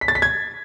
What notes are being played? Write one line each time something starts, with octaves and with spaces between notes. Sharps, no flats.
B6
A6
B6
G#6